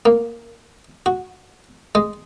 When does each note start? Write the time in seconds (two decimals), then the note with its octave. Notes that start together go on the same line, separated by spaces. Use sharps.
0.06 A#3
1.06 F#4
1.95 G#3